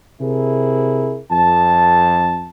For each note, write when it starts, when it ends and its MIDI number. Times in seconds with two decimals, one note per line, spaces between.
0.20 1.19 48
0.20 1.19 64
0.20 1.19 68
0.20 1.19 70
1.31 2.49 41
1.31 2.49 81